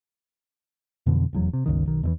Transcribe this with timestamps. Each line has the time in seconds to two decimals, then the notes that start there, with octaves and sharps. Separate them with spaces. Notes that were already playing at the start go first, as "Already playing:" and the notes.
1.06 F2 B2 D3 E3
1.33 F1 E2 F#3
1.53 C3
1.66 G1 C#2 D#3
1.87 B1 D#3
2.03 E2 D3 E3